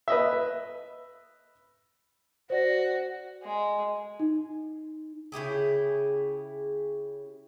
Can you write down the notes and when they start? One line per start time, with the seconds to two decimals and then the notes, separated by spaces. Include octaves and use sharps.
0.08 B4 D#5 E5
2.50 F#4 C5 D5 A#6
3.43 G#3
4.20 D#4
5.32 C#3 E4 G4 G#4